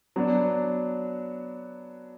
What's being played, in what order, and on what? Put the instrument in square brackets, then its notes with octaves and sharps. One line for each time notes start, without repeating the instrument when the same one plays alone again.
[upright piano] F#3 B3 D4